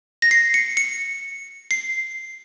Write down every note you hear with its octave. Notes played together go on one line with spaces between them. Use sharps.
A#6
C7
C#7
C#7
C7